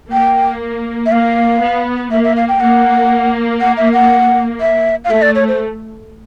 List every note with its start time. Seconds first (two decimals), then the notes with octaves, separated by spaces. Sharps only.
0.11 A#3 G5
1.06 E5
1.11 A#3 F5
1.61 B3
2.11 A#3 E5
2.24 E5
2.36 F5
2.49 G5
2.60 A#3 F#5
3.61 F#5
3.77 E5
3.93 F#5
4.60 E5
5.05 F5
5.10 A3 E5
5.22 D5
5.35 C#5
5.48 C5